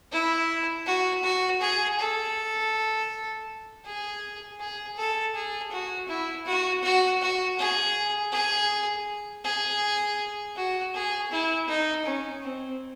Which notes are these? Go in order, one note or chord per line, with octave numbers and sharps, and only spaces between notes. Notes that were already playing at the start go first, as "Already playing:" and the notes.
E4
F#4
F#4
G#4
A4
G#4
G#4
A4
G#4
F#4
E4
F#4
F#4
F#4
G#4
G#4
G#4
F#4
G#4
E4
D#4
C#4
C4